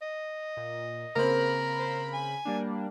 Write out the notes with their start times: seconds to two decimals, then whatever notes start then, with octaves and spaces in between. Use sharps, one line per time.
0.02 D#5
0.57 A#2
1.16 C#3 A#3 C4 A#4 B5
1.78 C5
2.13 G#5
2.45 G3 A#3 D4